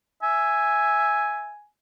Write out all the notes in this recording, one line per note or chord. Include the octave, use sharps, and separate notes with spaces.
E5 G#5